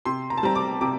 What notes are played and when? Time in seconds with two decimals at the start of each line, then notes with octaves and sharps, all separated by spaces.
0.05 C3 C6
0.30 A#5
0.37 A5
0.43 G3 C4 A#5
0.55 D6
0.81 C3 D6